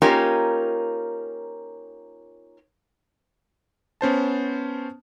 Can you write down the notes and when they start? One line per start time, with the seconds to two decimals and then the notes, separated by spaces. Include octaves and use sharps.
0.02 A#3 C#4 D#4 F4 G4 A#4
4.01 B3 C#4 C5 A5